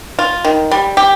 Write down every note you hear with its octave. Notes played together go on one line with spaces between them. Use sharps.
F4
D#3
G3
G4